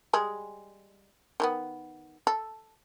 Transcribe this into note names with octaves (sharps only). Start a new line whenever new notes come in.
G3 G#3 G#4
D#3 A3 B3
A4